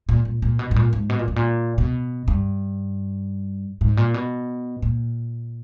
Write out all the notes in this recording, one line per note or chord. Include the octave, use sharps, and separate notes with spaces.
A#2
A#2
A#2
B2
G#2
A#2
G#2
B2
A#2
G#2
A#2
B2
G2
G#2
A#2
B2
A#2